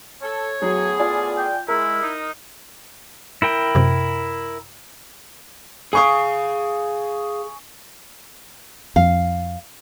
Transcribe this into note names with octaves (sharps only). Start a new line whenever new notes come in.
A4 C#5
A2 F#3 B3 G#4
F4 D5 G#5
G5
G#3 E4 A#4
D#4
E4 A#4 G5
F#2 C3
G#4 F5 G#5 C#6 D#6
F2 F5